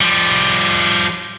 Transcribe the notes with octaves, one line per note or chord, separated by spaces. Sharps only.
F3 G3